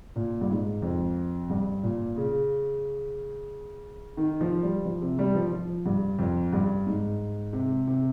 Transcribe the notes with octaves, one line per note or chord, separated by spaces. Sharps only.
A#2
G2
G#2
F2
G2
A#2
C#3
D#3
F3
G3
F3
C3
G3
F3
F3
G2
F2
G2
G#2
C3
C3